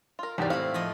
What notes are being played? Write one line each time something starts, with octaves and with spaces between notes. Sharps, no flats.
F4 A#4
E2 G#2 F#4 G4 D5
A2 C4 E4 F5
F2 F3 D#5